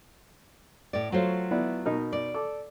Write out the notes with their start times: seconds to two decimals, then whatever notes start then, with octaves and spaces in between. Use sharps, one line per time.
0.93 A2 D5
1.12 F#3 A3 F4 F#4 C5 C#5
1.51 B3 E4 D5
1.86 B2 D#4 A#4
2.13 D5
2.34 A4 D6